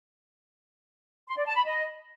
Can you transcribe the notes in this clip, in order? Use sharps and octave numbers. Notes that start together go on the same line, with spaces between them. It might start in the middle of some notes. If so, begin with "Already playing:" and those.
C6
D5
A5
B5
D#5